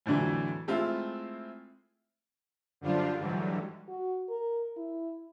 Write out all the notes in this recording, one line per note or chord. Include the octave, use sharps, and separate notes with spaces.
F2 A2 D3 E3 F#3
G#3 A3 C4 E4 F4
F#2 D3 F3 G3 D4 F4
G#2 D3 E3 F#3 G3
F#4
A#4
E4